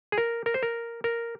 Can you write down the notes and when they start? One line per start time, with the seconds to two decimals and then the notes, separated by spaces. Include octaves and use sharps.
0.12 G#4
0.18 A#4
0.46 A#4
0.54 C5
0.63 A#4
1.04 A#4